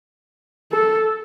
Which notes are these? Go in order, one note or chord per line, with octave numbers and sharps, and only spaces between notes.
A4